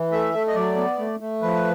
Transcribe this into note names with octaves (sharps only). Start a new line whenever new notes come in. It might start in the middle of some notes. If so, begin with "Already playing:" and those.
Already playing: E3
A3 E5
A3
D#5
F#3 D5
B3
A3
A3
F3 B4